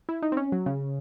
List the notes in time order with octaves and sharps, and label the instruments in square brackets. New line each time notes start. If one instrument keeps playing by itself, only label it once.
[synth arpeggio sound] E4
D#4
C4
C#4
F#3
C#3